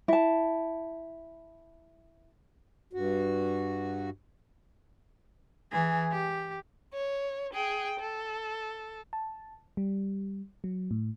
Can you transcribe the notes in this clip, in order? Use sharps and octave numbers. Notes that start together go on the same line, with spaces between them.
E4 A5
G2 F#4
E3 G#4
G4
C#5
G#4 G5
A4
A5
G3
F#3
A2